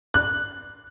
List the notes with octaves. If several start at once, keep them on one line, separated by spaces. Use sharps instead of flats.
F#6